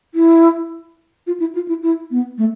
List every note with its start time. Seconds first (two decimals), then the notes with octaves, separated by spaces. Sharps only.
0.15 E4
1.27 F4
1.40 E4
1.55 F4
1.68 E4
1.82 E4
2.11 B3
2.38 A3